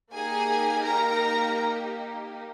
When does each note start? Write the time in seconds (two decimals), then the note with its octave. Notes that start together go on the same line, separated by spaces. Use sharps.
0.13 A#3 D#4 G4 G#4 G#5
0.85 A#4 A#5